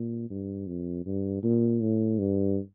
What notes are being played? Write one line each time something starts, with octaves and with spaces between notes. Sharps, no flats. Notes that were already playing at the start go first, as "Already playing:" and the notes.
Already playing: A#2
G2
F2
G2
A#2
A2
G2